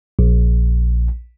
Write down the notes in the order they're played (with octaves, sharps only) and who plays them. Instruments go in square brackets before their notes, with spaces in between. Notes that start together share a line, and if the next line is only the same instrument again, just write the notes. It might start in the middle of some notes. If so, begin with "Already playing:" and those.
[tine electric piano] A#1